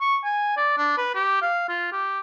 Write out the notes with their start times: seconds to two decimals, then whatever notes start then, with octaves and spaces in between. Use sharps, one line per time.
0.01 C#6
0.24 G#5
0.57 D5
0.78 D4
0.98 B4
1.15 G4
1.42 F5
1.69 F4
1.92 G4